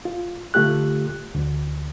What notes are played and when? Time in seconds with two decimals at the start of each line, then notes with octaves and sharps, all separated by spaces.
0.05 F4
0.54 D3 A3 F4 G4 F#6
1.35 D2